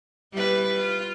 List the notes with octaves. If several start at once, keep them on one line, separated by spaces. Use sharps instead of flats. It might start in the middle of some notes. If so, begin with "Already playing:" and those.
G3 E4 B4
F4